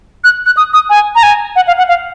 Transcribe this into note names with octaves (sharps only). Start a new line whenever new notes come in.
F#6
F#6
D#6
D#6
G#5
A#5
G#5
F#5
F5
F#5
F5